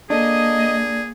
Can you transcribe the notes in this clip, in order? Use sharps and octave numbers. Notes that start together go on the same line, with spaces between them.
A#3 D4 G#4 A4 D#5